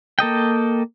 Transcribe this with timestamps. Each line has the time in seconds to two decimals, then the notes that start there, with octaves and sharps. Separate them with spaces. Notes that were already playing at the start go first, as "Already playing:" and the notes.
0.19 A#3 A4 D#5 G5